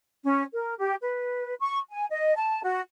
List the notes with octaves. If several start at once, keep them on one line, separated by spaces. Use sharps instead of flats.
C#4
A#4
G4
B4
C#6
G#5
D#5
A5
F#4